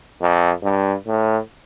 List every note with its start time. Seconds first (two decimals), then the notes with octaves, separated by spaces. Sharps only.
0.21 F2
0.63 G2
1.07 A2